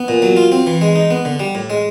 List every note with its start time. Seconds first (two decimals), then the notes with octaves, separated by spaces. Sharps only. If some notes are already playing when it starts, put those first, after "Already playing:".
Already playing: B3
0.08 A#2
0.22 F#3
0.37 F4
0.52 C4
0.67 E3
0.81 G#3
0.95 D#4
1.11 B3
1.25 D3
1.40 G3
1.55 A2
1.70 G#3